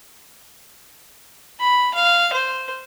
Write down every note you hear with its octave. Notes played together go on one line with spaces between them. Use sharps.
B5
F5
C5